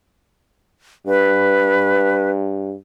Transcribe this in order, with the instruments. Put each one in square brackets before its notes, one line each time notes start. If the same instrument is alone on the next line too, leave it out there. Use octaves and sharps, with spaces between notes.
[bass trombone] G2 [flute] B4